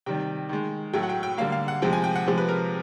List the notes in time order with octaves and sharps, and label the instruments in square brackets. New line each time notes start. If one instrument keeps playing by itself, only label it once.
[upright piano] C3 D#3 G3 G5
D#3 G#3
A2 F#3 A3 G5
F#5
G5
G5
D3 G3 A#3 F5
F5
F#5
C3 F3 G#3 G5
G#5
G5
F#5
C3 F3 G#3
B4
A#4